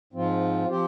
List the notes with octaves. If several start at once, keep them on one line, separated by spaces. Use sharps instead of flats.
G#2 F3 C4 F4
F3 C4 G4 C5